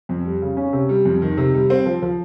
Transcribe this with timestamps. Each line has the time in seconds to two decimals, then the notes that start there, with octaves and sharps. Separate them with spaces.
0.09 F2
0.25 G3
0.42 C#3
0.57 C#4
0.73 C3
0.89 G3
1.05 F2
1.22 D#3
1.37 C3
1.54 G3
1.70 C4
1.86 F3
2.02 F3